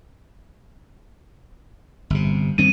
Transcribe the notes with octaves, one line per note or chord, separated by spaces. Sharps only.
G1 C3
G2 D#3 C4 D#7